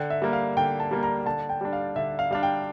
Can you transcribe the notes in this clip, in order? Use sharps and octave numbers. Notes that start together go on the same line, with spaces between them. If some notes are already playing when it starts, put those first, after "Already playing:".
Already playing: D3 G5
E5
G3 A#3
F5
D3 G5
A5
G3 A#3
A#5
D3 A5
G5
G3 D4
F5
D3 E5
F5
G3 D4 F5
G5